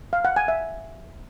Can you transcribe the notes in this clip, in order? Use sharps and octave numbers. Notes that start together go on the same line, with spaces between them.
F5
F#5
G#5
E5